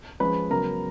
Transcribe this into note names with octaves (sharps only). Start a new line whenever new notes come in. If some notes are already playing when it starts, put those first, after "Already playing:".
F3 G#3 C#4 B4 B5
C#3 F#3 B3 A#4 A#5